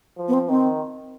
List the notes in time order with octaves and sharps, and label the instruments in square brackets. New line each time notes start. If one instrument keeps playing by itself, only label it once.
[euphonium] F3
[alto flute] B3
C4
[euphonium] D#3 [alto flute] C4